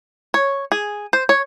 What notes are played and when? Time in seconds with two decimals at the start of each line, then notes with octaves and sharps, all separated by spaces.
0.34 C#5
0.72 G#4
1.13 C5
1.29 C#5